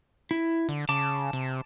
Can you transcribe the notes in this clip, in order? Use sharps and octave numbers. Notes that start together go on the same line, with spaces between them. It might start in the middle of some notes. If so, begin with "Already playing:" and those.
E4
D3
C#3 A5 D6
C3